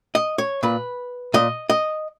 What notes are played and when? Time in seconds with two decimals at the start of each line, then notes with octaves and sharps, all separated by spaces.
0.15 D#5
0.38 C#5
0.63 A#2 B4
1.34 A#2 D#5
1.70 D#5